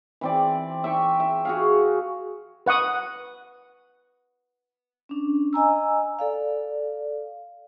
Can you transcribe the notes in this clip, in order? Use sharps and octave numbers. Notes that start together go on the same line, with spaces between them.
E3 C4 D5
E5 G5 C#6
E5
F#4 G#4 F5
B4 F#5 C#6 D#6
C#4 D4
D#5 G#5 A#5 E6
A4 D5 F5